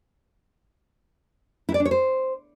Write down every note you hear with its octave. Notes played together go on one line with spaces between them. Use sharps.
E4
D5
D4
C#5
C5